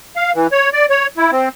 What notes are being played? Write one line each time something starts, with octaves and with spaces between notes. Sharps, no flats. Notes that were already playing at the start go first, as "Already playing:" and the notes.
F5
E3
C#5
D5
C#5
E4
C4